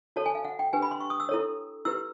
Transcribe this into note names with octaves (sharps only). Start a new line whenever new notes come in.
F#4 A4 C#5 A5
G#5
F5
F#5
G5
D4 G4 B4 G#5
B5
C6
C#6
D#6
E6
E4 A4 C#5
E4 G4 B4 E6